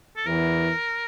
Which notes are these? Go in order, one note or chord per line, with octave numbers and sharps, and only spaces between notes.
A4
E2 E3 A#4